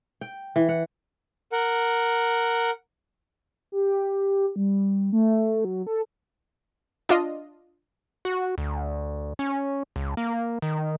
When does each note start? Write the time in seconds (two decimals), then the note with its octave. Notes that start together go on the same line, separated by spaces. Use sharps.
0.21 G5
0.56 E3
0.69 F#5
1.52 A#4 F#5
3.72 G4
4.56 G3
5.13 A3
5.65 F#3
5.87 A4
7.09 D4 F4 D#5
8.25 F#4
8.58 D2
9.39 C#4
9.96 C#2
10.17 A#3
10.62 D#3